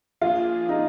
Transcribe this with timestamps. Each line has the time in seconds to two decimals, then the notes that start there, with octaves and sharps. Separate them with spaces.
0.22 F3 A#3 D4 F4 G#4
0.69 D#4